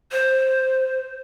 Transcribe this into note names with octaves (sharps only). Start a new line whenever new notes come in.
C5